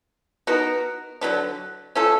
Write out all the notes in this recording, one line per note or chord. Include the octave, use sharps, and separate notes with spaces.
B3 D#4 F#4 A#4
D3 F#3 B3 D4
A3 C#4 F4 A4